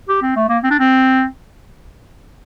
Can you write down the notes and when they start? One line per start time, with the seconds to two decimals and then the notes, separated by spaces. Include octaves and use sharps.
0.09 G4
0.23 C4
0.36 A3
0.49 A#3
0.64 C4
0.71 D4
0.79 C4